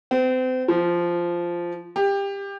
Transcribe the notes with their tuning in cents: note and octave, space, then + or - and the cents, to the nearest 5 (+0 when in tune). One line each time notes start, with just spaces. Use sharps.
C4 -35
F3 -10
G4 +20